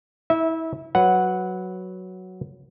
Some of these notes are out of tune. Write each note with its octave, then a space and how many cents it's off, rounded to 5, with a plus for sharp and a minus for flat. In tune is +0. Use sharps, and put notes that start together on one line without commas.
E4 -30 E5 -15
F#3 +0 B4 +0 F#5 +0